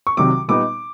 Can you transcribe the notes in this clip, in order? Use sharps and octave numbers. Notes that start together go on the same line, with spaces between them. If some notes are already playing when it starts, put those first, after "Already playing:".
C#6
C2 C3 D#3 F#3 D6
A#2 G3 B3 D#4 D6